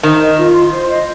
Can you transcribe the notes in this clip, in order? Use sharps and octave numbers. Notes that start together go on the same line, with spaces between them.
D#3 C5
D#5
F4
C6
C5
D#5